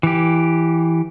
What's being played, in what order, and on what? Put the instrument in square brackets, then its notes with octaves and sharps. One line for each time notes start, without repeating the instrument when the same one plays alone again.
[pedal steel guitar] E3 G4